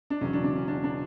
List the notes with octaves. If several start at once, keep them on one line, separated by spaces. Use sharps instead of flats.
D4
E1 E2 C#3 F#3 C#4
D4
D4
C#4
D4
D4